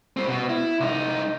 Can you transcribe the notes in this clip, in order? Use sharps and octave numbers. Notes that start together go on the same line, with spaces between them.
G3 C4
B2
E4
C2 D#4